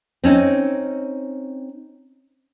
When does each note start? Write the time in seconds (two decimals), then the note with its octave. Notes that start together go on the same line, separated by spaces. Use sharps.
0.24 C4 C#4 D#4